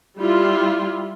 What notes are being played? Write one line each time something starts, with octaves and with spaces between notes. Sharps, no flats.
G3 E4 F4